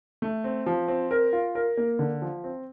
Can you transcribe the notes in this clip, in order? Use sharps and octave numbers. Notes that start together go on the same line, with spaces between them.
A3
C4
F3
C4
A#4
F4
A#4
A#3
D3
F3
C4